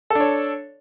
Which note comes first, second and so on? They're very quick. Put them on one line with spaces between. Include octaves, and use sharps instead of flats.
A4 D4 C#5